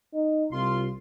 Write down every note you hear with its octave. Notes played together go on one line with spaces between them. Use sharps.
D#4
C2 F4 C6